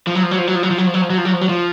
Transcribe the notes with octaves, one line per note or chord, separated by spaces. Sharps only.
F3
F#3
F3
F#3
F3
F#3
F3
F#3
F3
F#3
F3
F#3
F3
F#3
F3
F#3
F3
F#3
F3